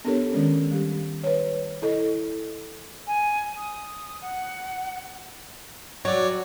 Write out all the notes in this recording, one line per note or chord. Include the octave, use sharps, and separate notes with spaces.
B3 D4 G4 A4 A#4 C#5
D#3 G#3 C#4
G3 G4
B4 C#5
E4 A4 D#5
G#5
D#6
F#5
F#3 C#5 D5